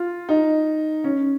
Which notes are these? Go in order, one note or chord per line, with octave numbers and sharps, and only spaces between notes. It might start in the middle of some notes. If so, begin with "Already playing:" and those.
Already playing: F4
D#4
C#4